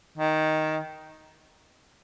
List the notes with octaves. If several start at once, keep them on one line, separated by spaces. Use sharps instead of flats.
D#3